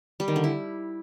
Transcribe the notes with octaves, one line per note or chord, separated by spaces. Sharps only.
G3
D#3
D3
E4